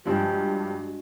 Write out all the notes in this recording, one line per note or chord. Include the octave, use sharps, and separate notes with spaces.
G2 F3 G#3 D4 F#4 G4